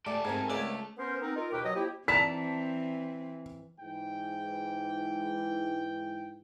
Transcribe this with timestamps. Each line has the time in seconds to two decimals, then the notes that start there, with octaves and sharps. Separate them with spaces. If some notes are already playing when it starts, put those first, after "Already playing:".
0.06 A3 G4 A4 D5
0.25 G#2 B3 C4 A#4 G#5
0.50 C#2 A3 D5
0.98 B3 C#4 A#4 C5
1.21 B3 C4 D#4 A#4
1.35 D#4 F4 A#4
1.53 D#2 B2 G4 B4 G5
1.64 F#3 D#5
1.75 F3 A#3 E4 G4
2.08 E3 C4 D5 A5 A#5 B6
3.80 G#2 E3 G5